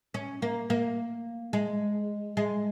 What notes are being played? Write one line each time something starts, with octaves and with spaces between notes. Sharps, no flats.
C#4
A#3
A#3
G#3
G#3